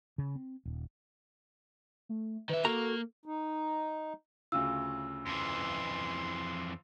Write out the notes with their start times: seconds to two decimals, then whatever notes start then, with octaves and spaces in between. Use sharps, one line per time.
0.18 C#3
0.36 C4
0.65 D#1
2.09 A3
2.49 D#3 B4 E5
2.65 A#3 F#4 A4 A#5
3.26 D#4
4.52 D2 C#3 F4 E6
5.26 F2 E3 C6